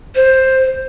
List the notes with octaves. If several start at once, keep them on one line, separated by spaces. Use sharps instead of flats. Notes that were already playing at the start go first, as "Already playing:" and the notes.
C5